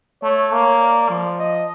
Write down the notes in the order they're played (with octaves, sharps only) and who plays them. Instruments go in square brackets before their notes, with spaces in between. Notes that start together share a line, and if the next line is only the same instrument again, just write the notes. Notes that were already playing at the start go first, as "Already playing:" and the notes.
[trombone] A3 [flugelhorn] C#5
[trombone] A#3
[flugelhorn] D5
[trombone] F3
[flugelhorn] D#5